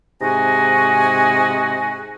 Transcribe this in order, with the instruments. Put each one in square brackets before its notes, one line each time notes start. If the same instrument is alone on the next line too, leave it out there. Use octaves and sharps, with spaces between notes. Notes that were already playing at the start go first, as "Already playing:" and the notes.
[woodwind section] G#2 C3 F#4 D#5 G#5